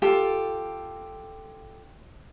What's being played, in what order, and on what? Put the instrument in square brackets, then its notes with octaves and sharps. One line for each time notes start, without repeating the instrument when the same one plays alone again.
[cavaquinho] F4 G4 A4